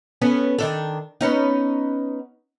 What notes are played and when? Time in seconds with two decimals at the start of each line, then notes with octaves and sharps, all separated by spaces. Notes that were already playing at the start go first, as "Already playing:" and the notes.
0.22 B3 C#4 A4
0.59 D#3 D4 A4
1.21 B3 C#4 D#4